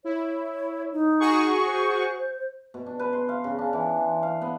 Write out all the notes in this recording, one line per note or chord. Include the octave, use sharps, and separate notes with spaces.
E4 C#5
D#4
F#4 G#4 C#6
C5
B2
D4
B4
C6
F5
C#3
D4
E3
C6
F5
B3